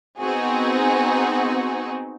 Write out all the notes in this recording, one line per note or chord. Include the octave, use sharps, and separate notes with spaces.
B3 C4 D#4 F#4 G#4